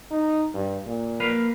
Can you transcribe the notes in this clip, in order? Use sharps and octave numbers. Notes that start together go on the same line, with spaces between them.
D#4
G2
A#2
A#3 B4 F5